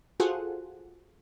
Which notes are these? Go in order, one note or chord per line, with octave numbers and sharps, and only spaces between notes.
F4 F#4 G#4 A4 C5 F#5